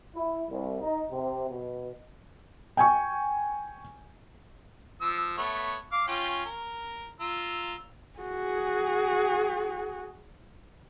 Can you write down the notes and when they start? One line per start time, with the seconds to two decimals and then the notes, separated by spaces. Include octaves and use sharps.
0.16 E4
0.50 C2
0.82 D#4
1.12 C3
1.50 B2
2.77 G5 G#5 C#6
5.01 F3 E6
5.38 A3 B3 C#5
5.92 F5 D6
6.08 C#4 F4 G5
6.45 A#4
7.20 F4 A#5 E6
8.19 F#4 G#4